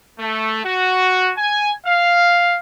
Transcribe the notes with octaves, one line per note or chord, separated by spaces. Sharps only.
A3
F#4
G#5
F5